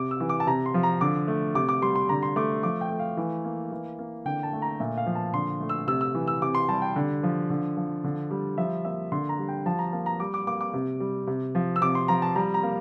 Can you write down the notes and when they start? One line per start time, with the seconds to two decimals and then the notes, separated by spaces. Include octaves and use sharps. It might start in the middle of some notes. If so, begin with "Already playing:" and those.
Already playing: C3 D6
0.11 E6
0.20 E3
0.29 D6
0.40 A5
0.47 C3 A#5
0.66 C6
0.74 F3
0.83 A#5
1.01 D3 D6
1.28 A3
1.55 C3 D6
1.69 D6
1.82 G3 C6
1.96 C6
2.09 D3 A#5
2.23 C6
2.36 A3 D6
2.63 F3 D6
2.81 G5
2.90 A3
2.99 F5
3.17 E3
3.45 A#3
3.72 E3
3.99 A#3
4.25 D3 G5
4.43 A5
4.53 A3
4.62 A#5
4.80 A#2 E5
4.97 F5
5.06 F3
5.15 A5
5.34 D3 C6
5.60 A3
5.69 E6
5.88 C3 E6
6.01 E6
6.15 E3
6.28 E6
6.42 C3 D6
6.55 C6
6.69 G3 A5
6.82 G5
6.96 D3
7.23 F3
7.50 D3
7.77 F3
8.04 D3
8.30 G3
8.58 F3 E5
8.85 A#3 E5
9.12 D3 C6
9.29 A#5
9.39 G3
9.48 G5
9.66 F3 A5
9.79 A#5
9.92 A#3 A5
10.06 A#5
10.20 G3 D6
10.34 D6
10.47 A#3 D6
10.61 D6
10.74 C3
11.00 G3
11.27 C3
11.55 F3
11.76 E6
11.82 C3 D6
11.95 C6
12.08 F3 A#5
12.22 A5
12.36 G3 A#5
12.54 A#5
12.63 A#3